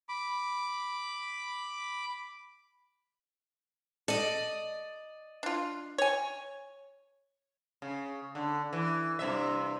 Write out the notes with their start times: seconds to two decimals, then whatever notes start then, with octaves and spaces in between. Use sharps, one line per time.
0.09 B5 D6
4.08 A4 D5 D#5
5.43 D4 F4
5.98 C#5 G#5
7.82 C#3
8.35 D3
8.73 E3
9.19 G2 C3 E5